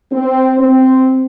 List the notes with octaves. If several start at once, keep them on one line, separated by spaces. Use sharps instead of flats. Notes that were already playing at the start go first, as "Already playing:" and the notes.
C4
C4